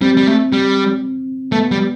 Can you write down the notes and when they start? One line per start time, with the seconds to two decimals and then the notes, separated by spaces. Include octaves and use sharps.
0.01 G3 C4
0.17 G3
0.27 A3
0.53 G3
1.52 A3 B3
1.71 G3